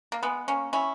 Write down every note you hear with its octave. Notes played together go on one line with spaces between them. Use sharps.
A#3
G#3 B3
A#3 C#4
C#4 E4